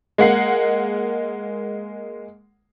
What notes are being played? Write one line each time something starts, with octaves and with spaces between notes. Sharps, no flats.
G#3 A#3 F#5 C7